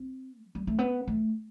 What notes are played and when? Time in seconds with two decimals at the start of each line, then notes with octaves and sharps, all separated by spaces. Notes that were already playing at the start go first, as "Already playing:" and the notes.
Already playing: C4
0.44 F3
0.55 G3
0.67 A3
0.79 B3
1.08 A3